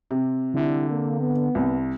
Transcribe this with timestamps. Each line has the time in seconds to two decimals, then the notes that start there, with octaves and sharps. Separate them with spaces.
0.11 C3
0.54 D3 G3 E4
0.90 A#3
1.21 B3
1.55 C2